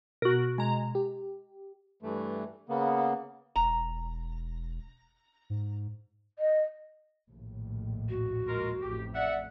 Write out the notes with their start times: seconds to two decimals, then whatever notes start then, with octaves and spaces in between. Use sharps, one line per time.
0.22 B2 F#4 A#4
0.58 G#3 A#5
0.95 G4
2.02 G2 E3 A3
2.69 C#3 A#3 B3
3.56 E1 A#5
5.50 G#2
6.39 D#5
7.29 A#1 D#2 A2
8.09 F#4
8.48 G#3 F4 A#4
8.81 A1 F2 A2 G4
9.15 D5 E5 F#5